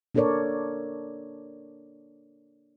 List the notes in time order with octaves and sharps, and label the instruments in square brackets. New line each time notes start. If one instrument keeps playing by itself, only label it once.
[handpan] A#3 D4 A4 A#4 C#5 D5